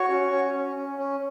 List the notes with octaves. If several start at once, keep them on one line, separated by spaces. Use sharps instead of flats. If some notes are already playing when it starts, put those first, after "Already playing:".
Already playing: F#4 C#5 C#6
C#4
C#4
C#4
C#4
C#4